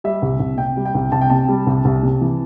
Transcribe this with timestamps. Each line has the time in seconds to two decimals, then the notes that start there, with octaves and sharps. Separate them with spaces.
0.04 G3 E5
0.22 C2
0.40 C2
0.58 C3 G5
0.77 G3
0.85 G5
0.95 C2
1.12 C2 A5
1.21 G5
1.30 C3 A5
1.48 G3
1.67 C2
1.85 C2
2.03 C3
2.21 E3